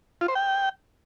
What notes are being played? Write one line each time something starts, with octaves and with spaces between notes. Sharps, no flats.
F4
C5
G5